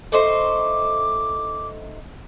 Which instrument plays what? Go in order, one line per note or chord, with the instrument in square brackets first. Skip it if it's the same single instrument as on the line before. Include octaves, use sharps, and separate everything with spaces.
[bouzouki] A3 D#4 C5 [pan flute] D6